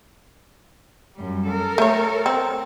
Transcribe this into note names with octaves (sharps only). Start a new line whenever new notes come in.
F#2 G3
A4 A#4
A3 C#5
C4